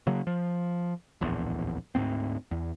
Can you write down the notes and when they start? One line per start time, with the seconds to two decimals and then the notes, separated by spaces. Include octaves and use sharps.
0.07 C#3 F#3 A#3
0.27 F3
1.21 D1 A#1 E2
1.95 D2 G#2 B3 C4
2.51 E2